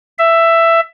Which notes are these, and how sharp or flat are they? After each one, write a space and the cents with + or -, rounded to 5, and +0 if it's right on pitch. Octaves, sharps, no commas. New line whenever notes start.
E5 +10